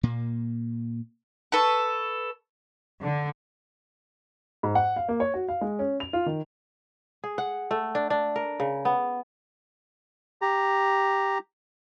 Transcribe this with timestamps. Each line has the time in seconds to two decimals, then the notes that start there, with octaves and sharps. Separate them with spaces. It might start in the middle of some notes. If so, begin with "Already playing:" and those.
0.03 A#2 A#3
1.52 A4 B4 C#6
3.02 D3
4.63 G#2
4.75 F#5
4.96 F5
5.09 A#3
5.20 C#5
5.34 F#4
5.48 F5
5.61 G#3
5.79 C#4
6.00 F7
6.13 F4
6.26 D#3
7.24 G#4
7.38 F#5
7.71 A3
7.95 D4
8.10 D4
8.36 A#4
8.60 C#3
8.85 B3
10.42 G4 A#5